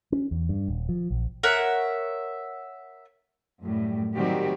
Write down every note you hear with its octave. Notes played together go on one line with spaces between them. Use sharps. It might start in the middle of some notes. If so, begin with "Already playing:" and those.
C#4
E2
G2
D#1
F3
A#1
A#4 C#5 E5 F#5
F#2 A2 G3
D#3 F#3 G3 C4 F#4 G4